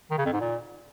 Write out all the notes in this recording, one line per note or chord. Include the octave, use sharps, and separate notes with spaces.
D#3
C#3
F2
G#2
A#2